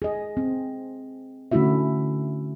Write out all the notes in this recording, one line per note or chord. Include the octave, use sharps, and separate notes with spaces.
G#4 D#5
C4
D3 A3 C#4 E4 F#4 E5